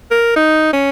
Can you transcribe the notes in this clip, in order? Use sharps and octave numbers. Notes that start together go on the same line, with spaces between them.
A#4
D#4
C#4